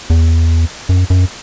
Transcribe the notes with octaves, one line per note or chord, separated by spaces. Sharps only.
E2
F#2
F#2